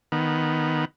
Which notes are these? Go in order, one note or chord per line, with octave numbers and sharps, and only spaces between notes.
D#3 B3